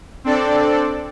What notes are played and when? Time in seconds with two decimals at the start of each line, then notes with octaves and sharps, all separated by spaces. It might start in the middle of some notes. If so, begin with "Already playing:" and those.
0.24 C4 D4 A4 D5